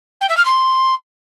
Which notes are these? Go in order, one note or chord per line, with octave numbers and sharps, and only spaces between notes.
G5
E5
F6
C6